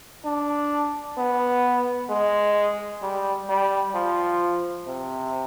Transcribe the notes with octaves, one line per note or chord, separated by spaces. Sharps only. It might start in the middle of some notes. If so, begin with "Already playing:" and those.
D4
B3
G#3
G3
G3
F3
C3